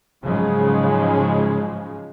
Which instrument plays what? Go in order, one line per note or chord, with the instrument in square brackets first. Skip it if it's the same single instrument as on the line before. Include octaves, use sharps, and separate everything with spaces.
[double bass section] G#2 C#3 F3 F#3 G#3